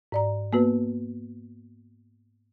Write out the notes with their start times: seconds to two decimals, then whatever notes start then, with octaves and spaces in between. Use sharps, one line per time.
0.12 G#2 D5 A#5
0.53 A#3 B3 F#4 B4